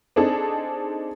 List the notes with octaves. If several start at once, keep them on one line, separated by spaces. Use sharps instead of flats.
C4 D4 D#4 G#4 A4